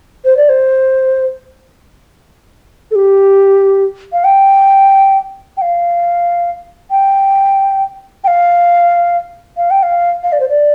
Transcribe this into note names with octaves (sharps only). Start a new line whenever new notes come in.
C5
D5
C5
A4
G4
F5
G5
G5
F5
G5
G5
F5
F5
G5
F5
F5
D5
C5
D5